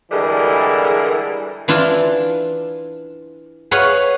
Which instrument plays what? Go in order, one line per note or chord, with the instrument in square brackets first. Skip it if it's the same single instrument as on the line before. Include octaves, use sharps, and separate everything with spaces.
[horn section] D3 E3 G3 G#3 A4 A#4
[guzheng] E3 D4 E4 F4
G#4 B4 C#5 F5 F#5